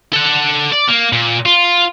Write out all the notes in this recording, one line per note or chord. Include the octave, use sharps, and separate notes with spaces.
A4 F#5
D5
A#3
A#2
F4